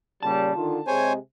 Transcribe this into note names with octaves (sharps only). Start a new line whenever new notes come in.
A#2 C#3 G3 A5
D3 D#3 F4
C3 G#3 C5 C#5 G#5